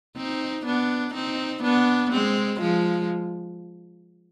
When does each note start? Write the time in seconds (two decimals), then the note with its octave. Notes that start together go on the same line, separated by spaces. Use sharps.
0.16 C4 D#4
0.66 B3 D4
1.14 C4 D#4
1.63 B3 D4
2.12 G#3 C4
2.61 F3 G#3